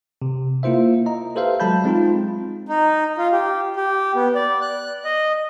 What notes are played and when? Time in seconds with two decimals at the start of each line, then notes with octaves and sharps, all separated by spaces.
0.22 C3
0.63 A#3 E4 F4 C5 E5
1.06 D#5 A#5
1.36 G4 A4 B4 C5 E5 F5
1.60 F#3 G#3 A5 B5 G6
1.84 G#3 C4 D#4 F4
2.69 D#4
3.18 F4
3.33 G4
3.76 G4
4.15 B3
4.35 D5
4.62 F#6
5.05 D#5